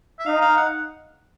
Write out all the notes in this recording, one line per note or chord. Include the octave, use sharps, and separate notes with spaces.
E5
D#4 F5
F5
F#5